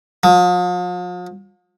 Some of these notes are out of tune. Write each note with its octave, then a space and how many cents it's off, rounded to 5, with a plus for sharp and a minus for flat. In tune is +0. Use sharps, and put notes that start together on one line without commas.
F3 +40